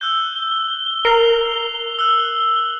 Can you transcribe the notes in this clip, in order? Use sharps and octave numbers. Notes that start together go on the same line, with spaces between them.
E6 F#6 G6 G7
A#4 C7 F7
E6 F#6